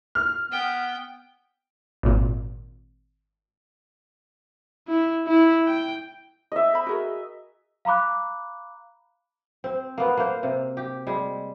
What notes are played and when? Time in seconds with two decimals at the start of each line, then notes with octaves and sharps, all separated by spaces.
0.15 F6
0.52 B3 G5
2.03 G#1 A#2
4.88 E4
5.28 E4
5.67 G5
6.52 D#5 E5
6.73 C5 B5
6.87 F#4 G#4 A#4
7.85 F5 A#5 B5 D6 F#6
9.64 C4
9.98 A#3 B3
10.17 A#3 C5
10.43 C3
10.77 G4
11.07 G3 G#3